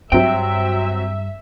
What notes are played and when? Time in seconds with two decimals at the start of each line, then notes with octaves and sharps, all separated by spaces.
0.12 G2 F#3 C4 E5 G5